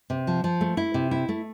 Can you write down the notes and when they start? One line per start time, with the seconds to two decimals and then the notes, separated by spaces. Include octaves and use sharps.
0.10 C3
0.27 F3
0.44 F3
0.61 A3
0.77 E4
0.94 C3
1.11 E4
1.29 A3